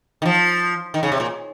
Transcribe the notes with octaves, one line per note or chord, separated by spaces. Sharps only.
D#3
F3
D#3
C#3
C3
A#2